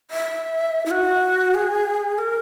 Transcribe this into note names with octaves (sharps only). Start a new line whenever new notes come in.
E5
E4
F#4
G#4
A#4